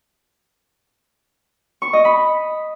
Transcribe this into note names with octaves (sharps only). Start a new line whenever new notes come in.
C#6
D#5
B5